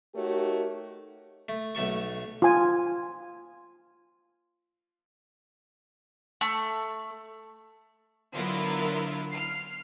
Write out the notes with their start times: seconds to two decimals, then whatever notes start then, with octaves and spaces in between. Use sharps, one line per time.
0.15 A3 D#4 F#4 G4 A#4 C#5
1.49 A3
1.75 B1 A3 A4 C#6
2.42 F4 G#5
6.41 A3
8.34 D3 F#3 B3 E4 F4 A#4
9.31 F6 C7